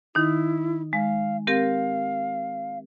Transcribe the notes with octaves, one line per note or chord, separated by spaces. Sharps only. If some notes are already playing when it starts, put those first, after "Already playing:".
D#3 D#4 E4
G#3 F5
C4 G4 A#4 F5